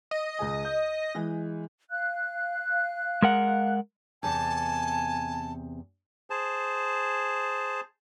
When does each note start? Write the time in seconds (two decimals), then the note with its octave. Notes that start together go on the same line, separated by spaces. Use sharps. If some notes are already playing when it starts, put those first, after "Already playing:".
0.11 D#5
0.39 C#2 G#4 G#5
0.65 G6
1.15 E3 G#3
1.90 F5 F#6
3.22 G#3 A#4 F#5
4.23 E2 C3 G#5 A5
6.30 G#4 C5 A5